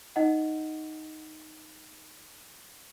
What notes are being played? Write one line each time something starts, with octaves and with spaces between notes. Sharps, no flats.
D#4 D#5 F#5